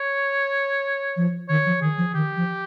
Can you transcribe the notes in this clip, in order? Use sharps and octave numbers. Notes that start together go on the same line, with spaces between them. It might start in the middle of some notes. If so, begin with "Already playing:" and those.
Already playing: C#5
F3
D#3 C#5
F3
D#3 G#4
F3
D#3 G4
F3